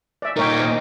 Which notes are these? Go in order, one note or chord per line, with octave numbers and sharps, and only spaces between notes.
D5 E5
A#2 D#4 A#4 C#5 G5
C5 D#5